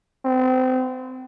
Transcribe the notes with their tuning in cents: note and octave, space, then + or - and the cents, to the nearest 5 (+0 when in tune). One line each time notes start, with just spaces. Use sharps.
C4 -30